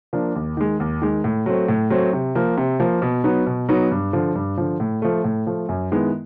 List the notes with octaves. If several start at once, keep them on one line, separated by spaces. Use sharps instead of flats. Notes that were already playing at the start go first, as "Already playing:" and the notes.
F3 A#3 D4
D#2
D#3 G#3
D#2
D#3 G#3
A2
F#3 A3 C4
A2
F#3 A3 C4
C3
F3 A#3
C3
F3 A#3
B2
F#3 B3 D#4
B2
F#3 B3 D#4
G2
D3 F3
G2
D3 F3
A2
F3 A3
A2
F3 A3
F#2
D#3 G#3 B3 E4